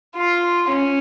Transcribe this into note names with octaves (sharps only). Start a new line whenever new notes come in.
F4
C#4